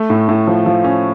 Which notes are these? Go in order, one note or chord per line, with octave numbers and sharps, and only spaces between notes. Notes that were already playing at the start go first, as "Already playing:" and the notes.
Already playing: A3
A2
A2
F3
F3
C#4